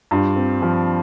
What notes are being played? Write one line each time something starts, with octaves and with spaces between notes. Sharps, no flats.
G2 F4
C4
F3